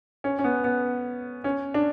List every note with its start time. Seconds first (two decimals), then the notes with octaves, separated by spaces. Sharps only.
0.24 C#4
0.39 C#4
0.44 B3
0.64 B3
1.44 C#4
1.74 D4